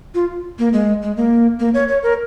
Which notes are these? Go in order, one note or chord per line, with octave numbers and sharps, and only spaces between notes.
F4
A#3
G#3
G#3
A#3
A#3
C#5
C#5
A#4